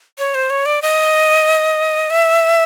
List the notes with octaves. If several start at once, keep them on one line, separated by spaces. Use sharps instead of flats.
C#5
C5
C#5
D5
D#5
E5